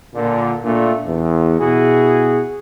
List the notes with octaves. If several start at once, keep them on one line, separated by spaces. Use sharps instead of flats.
A#2 D3
A#2 A3 D4
E2
B2 E4 F#4 G#4